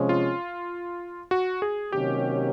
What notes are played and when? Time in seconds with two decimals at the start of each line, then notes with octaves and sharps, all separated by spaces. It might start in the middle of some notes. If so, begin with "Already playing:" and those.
Already playing: C3 F3 G#3 C#4
0.09 F4
1.31 F#4
1.62 G#4
1.92 C3 D#3 F#3 A#3 C#4 G4